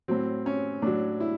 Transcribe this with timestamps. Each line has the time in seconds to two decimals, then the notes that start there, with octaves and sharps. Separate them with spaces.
0.08 A2 F#3 C4
0.46 C#4
0.82 A2 F#3 D4
1.20 E4